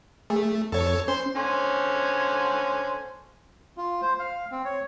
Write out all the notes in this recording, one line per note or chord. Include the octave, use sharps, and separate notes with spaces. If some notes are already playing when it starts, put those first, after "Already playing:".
A3 G#4
F2 A4 C#5
C#4 C5 C6
D3 C#4 C5
F4
C5
F5
C4
C#5